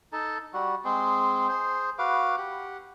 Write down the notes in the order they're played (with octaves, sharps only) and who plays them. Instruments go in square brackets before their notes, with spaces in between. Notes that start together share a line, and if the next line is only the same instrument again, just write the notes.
[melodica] D#4 A4 A5
G3 F#4
G#3 C4 G#4
G#4 C5
F#4 B4 F5 D6
G4 F#5